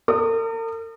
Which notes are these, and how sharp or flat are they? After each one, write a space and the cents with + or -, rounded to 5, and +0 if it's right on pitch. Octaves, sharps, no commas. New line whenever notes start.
A#4 -45 D#6 -30